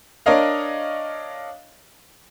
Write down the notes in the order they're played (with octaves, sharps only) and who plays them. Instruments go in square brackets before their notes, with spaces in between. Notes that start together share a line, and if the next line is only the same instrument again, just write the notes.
[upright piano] D4 A#4 C#5 D#5 F5